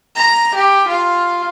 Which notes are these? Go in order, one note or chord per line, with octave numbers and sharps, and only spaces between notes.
A#5
G4
F4